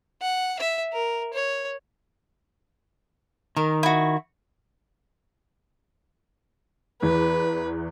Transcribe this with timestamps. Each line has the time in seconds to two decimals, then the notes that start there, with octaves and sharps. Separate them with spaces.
0.21 F#5
0.59 E5
0.92 A#4
1.33 C#5
3.57 D#3 A#4
3.83 E4 F#4
7.02 E2 E3 B4